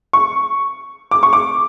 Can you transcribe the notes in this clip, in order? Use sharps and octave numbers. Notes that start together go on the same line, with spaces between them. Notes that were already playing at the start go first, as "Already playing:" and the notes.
C#6
D6
C#6
D6